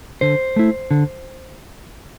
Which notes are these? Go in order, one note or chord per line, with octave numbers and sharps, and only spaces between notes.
D3 C5
A3 E4
D3